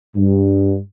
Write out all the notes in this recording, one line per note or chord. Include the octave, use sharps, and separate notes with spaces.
G2